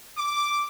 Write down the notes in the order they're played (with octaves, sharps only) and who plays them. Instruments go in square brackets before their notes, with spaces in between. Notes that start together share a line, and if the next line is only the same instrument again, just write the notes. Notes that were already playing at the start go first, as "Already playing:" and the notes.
[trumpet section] D6